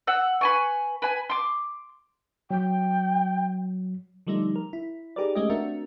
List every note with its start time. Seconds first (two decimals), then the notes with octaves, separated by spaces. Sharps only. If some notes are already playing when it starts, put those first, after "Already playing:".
0.07 F#5 E6
0.41 B4 G#5 C#6
1.02 B4 G#5
1.30 C6 D6
2.51 F#3 G5
4.27 D3 F3 G3 A3 D#4
4.56 A#4
4.73 E4
5.16 D#4 G4 G#4 A#4 B4 D5
5.35 G#3 A3 C#4 G4 D#5
5.50 A3 C4 D4 F#4 A#4 E5